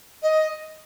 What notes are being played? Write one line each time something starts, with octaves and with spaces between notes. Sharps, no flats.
D#5